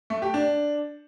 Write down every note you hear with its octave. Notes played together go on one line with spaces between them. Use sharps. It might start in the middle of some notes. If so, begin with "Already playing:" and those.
A3
G4
D4